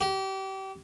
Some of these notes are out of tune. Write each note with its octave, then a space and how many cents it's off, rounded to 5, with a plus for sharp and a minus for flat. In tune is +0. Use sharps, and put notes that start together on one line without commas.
G4 -30